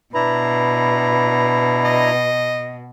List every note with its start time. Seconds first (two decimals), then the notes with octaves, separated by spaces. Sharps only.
0.15 B2 D4 E4 B4 A#5
1.84 D#5